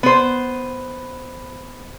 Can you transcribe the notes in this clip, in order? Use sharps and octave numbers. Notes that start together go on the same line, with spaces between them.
B3 C5